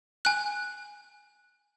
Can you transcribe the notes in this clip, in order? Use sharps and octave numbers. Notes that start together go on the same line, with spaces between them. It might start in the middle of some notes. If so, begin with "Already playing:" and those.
G#5 F#6